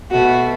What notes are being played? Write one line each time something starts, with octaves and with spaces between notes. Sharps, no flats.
B2 A3 F#4